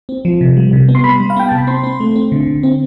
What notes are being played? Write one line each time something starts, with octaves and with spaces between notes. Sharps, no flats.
C4
F3
C3
G3
C3
B3
C6
G3 B5
G3
F5
B3 G5
C3 A5
B5
C4 C6
C4
A3
C4
D3
D3
C4